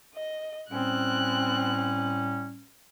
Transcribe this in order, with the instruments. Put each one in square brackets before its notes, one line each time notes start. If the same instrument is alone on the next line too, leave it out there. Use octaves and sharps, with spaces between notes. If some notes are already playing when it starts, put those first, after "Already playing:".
[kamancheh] D#5
[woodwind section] A2 G3 C#4 [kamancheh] C4 F#6